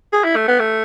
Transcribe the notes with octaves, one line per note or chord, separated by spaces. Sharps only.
G#4
E4
A3
B3
A3